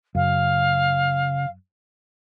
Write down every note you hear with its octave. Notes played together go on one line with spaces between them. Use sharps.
F#2 C#3 F5